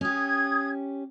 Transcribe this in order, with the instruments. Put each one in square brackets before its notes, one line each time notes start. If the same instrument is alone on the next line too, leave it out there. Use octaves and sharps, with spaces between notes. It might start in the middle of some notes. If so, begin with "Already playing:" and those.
[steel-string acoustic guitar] C#4 G4 [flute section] D#6 G#6